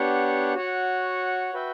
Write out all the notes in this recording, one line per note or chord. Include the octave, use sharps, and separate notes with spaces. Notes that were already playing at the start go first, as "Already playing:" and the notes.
Already playing: B3 D4 G4 C#5 F#5
F#4 C#5 F#5
F#4 B4 E5 G5